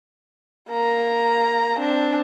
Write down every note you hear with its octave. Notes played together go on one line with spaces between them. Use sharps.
A#3 A#5
C4 D4